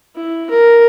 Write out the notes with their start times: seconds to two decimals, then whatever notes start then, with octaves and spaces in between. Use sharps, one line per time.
0.16 E4
0.50 A#4